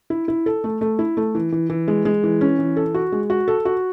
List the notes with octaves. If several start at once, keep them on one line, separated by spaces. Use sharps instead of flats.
E4
E4
A4
A3
A3
E4
A3
E3
E3
E3
G#3
G#3
E3
C#4
E3
A4
F#4
G#3
F#4
A4
F#4